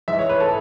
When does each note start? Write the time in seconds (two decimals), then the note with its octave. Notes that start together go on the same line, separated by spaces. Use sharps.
0.08 G#2 E3 E5
0.19 C#5
0.29 B4
0.40 A4